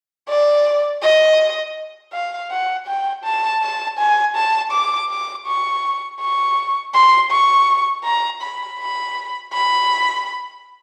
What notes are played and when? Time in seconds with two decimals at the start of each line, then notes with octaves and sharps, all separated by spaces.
0.29 D5
1.02 D#5
2.13 F5
2.51 F#5
2.87 G5
3.24 A5
3.62 A5
3.99 G#5
4.36 A5
4.72 D6
5.10 D6
5.47 C#6
6.21 C#6
6.94 C6
7.31 C#6
8.04 A#5
8.42 B5
8.80 B5
9.53 B5